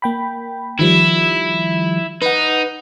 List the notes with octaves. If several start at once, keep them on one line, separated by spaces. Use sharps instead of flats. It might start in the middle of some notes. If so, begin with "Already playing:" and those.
A#3 G5 B5
D#3 F3 G3 E4
D#4 B4 F#5